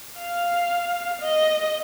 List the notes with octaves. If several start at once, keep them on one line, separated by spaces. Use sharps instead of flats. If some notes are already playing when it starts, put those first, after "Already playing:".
F5
D#5